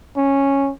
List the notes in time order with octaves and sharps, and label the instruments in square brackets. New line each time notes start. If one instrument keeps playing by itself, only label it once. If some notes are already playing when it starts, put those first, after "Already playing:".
[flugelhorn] C#4